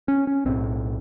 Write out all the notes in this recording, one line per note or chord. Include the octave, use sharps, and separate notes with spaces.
C#4
C#4
B1 A2 C4